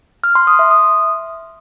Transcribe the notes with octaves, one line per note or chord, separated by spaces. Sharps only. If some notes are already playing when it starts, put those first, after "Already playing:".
F6
C6
D#6
E5
D#6